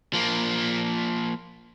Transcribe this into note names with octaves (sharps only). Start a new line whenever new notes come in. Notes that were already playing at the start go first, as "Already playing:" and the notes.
F3 A#3